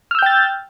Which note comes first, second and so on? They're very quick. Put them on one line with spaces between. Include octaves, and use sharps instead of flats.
F6 E6 G6 G5 A6